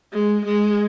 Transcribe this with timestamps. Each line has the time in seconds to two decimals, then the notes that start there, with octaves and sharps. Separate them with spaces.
0.13 G#3
0.46 G#3